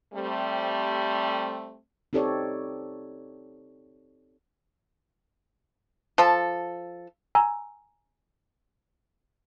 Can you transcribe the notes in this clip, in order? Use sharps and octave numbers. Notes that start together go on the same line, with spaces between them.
G3 A3 C4
C4 D#4 G4 A4 C#5 D5
F3 A4
G#5 A#5 E6